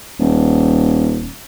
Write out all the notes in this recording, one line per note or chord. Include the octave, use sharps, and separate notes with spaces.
D#1